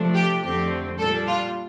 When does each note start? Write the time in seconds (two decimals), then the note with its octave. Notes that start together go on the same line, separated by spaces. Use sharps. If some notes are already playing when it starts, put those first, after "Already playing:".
Already playing: C3 F3 A3 D4
0.14 G4
0.42 F2 D3 A3 C4 G4
0.98 A#2 G3 D4 A4
1.26 F4